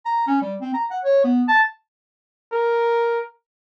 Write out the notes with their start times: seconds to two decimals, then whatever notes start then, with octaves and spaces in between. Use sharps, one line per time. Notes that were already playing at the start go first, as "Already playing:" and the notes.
0.05 A#5
0.27 C#4
0.42 G3
0.61 C4
0.74 A#5
0.91 F#5
1.04 C#5
1.24 B3
1.48 A5
2.52 A#4